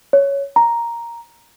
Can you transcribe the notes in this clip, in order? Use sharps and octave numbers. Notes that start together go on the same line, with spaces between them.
C#5
A#5